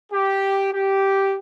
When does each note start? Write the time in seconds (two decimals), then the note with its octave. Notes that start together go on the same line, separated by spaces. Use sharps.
0.12 G4
0.72 G4